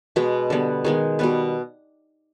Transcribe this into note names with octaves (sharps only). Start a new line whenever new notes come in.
B2 G#3 B3 B4
D3 G3 B3
D#3 G#3 B3 G#4
B2 G3 B3 B4